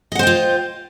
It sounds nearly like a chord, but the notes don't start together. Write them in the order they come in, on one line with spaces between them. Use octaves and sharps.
D#5 F#5 C5 G5 F4